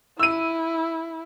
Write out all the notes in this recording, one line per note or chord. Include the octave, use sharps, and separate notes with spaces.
E4 E6 D#7